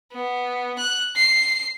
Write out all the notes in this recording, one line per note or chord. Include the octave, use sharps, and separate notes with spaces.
B3
F#6
C7